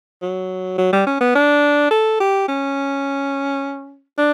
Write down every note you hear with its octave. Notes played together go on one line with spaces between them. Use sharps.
F#3
F#3
G3
C#4
B3
D4
A4
G4
C#4
D4